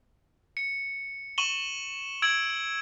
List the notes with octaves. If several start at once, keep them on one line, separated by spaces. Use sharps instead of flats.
C#7
C#6 D#7 E7 F#7 G7
E6 G#6 D7 F#7